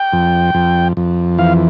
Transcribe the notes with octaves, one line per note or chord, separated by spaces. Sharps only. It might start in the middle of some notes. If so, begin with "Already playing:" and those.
Already playing: G5
F2
F2
F2
E3 F5